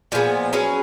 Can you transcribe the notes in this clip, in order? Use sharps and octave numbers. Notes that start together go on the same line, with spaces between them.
A#2 F3 G#3 B3
F#3 C#4 G#4 B4